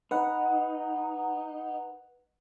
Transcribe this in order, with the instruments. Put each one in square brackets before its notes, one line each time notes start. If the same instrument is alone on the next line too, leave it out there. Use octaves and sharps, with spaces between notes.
[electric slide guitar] D#4 [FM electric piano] B4 F#5